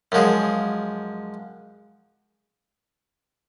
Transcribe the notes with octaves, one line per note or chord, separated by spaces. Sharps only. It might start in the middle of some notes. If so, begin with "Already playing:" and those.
F#2 F3 G#3